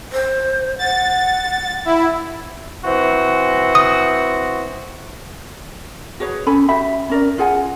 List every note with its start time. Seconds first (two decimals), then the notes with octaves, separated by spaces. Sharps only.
0.12 C5
0.79 F#5 A6
1.85 E4
2.84 E3 C4 F#4
3.75 D#6
6.20 F#4 G#4 B4 C#5
6.46 C#4 A4 G#5 B5
6.69 F#4 G4 E5 B5
7.10 C#4 A#4 D5
7.38 F4 G#4 F#5 G#5